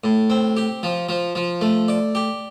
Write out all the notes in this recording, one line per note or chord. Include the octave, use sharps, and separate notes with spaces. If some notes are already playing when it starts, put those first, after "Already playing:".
A2
C4
G4
F3
F3
F3
A3
D5
G4